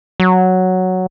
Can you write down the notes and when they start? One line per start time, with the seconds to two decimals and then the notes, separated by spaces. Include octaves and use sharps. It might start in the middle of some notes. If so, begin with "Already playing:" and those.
0.20 F#3